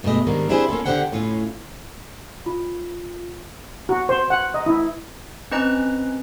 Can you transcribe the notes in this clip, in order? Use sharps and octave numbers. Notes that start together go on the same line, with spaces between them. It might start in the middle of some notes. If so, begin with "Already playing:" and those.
G2 B2 G#3 A3 D#5
G#2 D#3 G3 A#3 D4
C4 D4 E4 G4 G#4 C5
A#3 C#4 F4 A4
D3 G4 C5 F#5 G5
A2 C#4 F4
F4
F#4
C5
F#5
D#5
E4
C4 C#4 B4 D#5 A#5 F#6